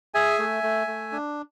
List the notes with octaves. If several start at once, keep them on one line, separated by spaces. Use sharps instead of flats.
G#4 E5 G#5
A3
A3
A3
D4